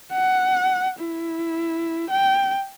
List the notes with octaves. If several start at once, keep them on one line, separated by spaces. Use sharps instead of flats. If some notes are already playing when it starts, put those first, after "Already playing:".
F#5
E4
G5